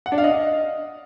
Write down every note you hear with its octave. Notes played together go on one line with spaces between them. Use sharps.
F#5
D4
F5
D#5